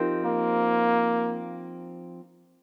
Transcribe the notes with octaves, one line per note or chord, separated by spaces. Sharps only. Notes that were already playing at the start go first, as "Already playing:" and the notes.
Already playing: F3 C4 D#4 G4 A#4
A#3